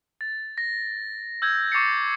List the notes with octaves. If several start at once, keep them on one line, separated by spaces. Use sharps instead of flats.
A6
A#6
E6 G6 G#6
C#6 D6 A6 C7 C#7